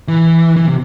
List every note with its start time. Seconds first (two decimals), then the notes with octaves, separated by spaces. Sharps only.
0.08 E3
0.57 E3
0.68 C3